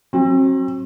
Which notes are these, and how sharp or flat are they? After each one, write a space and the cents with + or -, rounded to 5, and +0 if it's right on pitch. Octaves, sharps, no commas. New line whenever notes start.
F#3 +5 C4 +40